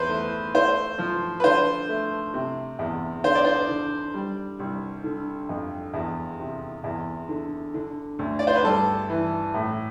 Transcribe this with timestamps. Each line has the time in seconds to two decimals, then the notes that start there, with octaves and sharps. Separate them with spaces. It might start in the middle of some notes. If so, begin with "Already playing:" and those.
Already playing: E2 B4 C5
0.09 A3
0.54 A3 C5
0.99 F3
1.40 B4
1.44 D3 C5
1.89 A3
2.34 C3
2.79 E2
3.24 D3 C5
3.35 D5
3.45 C5
3.69 D3
4.14 G3
4.59 C2
5.04 D3
5.49 F2
5.93 E2
6.40 C3
6.84 E2
7.29 D3
7.74 D3
8.19 D2
8.39 D5
8.47 C5
8.55 B4
8.63 G2 A4
9.10 E3
9.54 A2